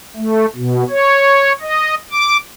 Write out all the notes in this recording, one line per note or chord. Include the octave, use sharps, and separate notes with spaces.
A3
B2
C#5
D#5
D6